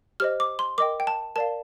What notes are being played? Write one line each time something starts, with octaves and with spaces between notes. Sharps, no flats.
G4 C5 D#5 F6
D6
C6
A#4 D#5 G5 D6
G5
A5
A#4 D5 F5 A5